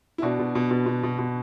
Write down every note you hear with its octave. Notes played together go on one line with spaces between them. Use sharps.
E4
B2 D4 F#4
B2
B2
B2
B2
B2
B2